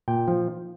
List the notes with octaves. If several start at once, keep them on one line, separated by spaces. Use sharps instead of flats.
A#2 G5
F3